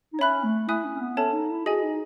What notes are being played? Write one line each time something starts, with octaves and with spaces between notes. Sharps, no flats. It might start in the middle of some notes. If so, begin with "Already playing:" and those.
D#4
C#4 C#5 E5 B5 F#6
A3
E4 E5 G#5 D#6 F#6
C#4
C#4
B3
C#4 A4 C#5 E5 A5
D#4
E4
F#4 G#4 D#5 G#5
D#4